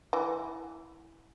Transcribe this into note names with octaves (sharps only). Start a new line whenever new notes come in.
E3